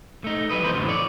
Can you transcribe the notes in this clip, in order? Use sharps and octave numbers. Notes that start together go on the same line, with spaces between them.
A3 D#4
F#3 G3 B4 D#5
E3 B3 B4 C5
F#2 A2 D3 F3 F#3
C#5 D5